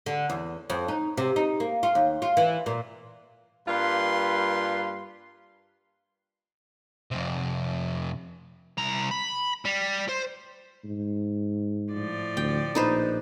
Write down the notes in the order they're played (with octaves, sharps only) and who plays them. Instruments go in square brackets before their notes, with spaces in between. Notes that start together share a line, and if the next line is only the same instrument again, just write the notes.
[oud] D3
E2
F2
D#4
C3
D#4
A#3
F4
D#2
F4
E3
A#2
[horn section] G2 G3 A#3 F4 B4 C6
[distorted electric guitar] F2 C3
C2 A#5
B5
G3
C5
[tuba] G#2
[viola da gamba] A2 F3 D5
[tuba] D2 [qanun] G5
[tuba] A#1 [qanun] D#4 B4 C5